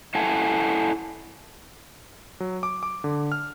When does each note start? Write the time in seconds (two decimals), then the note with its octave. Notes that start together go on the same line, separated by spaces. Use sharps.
0.15 E4 A4 F#5 G#5 A5
2.40 F#3
2.63 D6
2.83 D6
3.04 D3
3.32 F6